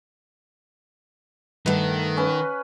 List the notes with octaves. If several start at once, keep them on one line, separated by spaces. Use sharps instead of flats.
G2 D#3 A3 B4 F#5
C#4 B4